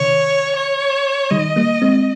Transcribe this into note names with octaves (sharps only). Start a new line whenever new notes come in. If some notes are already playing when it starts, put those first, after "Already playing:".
Already playing: C3 D#3 C#5
C#5
D#3 G3 D#5
G3 A#3
G#3 C4